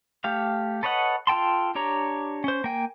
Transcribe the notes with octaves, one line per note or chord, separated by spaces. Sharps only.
A3 G4 F5
A4 B4 C#5 D#5 F#5
F4 A4 G5 A5 C6
D4 G4 C#5 A#5
C#4 C5
A#3 G5 G#5